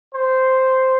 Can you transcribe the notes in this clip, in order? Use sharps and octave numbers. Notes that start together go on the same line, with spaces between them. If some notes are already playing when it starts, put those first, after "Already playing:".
C5